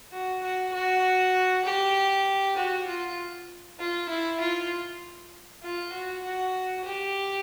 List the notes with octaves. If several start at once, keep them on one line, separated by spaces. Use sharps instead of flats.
F#4
F#4
F#4
G4
F#4
F4
F4
E4
F4
F4
F#4
F#4
G4